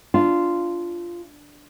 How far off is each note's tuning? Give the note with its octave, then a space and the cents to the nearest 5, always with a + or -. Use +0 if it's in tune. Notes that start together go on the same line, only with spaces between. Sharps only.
D4 +0 F4 -10